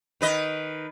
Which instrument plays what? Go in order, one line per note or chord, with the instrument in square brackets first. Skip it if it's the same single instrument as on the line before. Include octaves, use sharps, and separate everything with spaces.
[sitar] D#3 B4 D#5